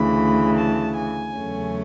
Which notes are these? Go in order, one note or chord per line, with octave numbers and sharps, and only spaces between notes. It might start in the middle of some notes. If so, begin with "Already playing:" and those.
Already playing: D2 C#3 E3 B5
A5
G#5
E2 C#3 F#3 A3 C#4